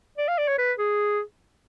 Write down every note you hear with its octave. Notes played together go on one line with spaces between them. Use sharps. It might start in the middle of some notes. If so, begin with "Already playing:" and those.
D5
F5
D5
C#5
B4
G#4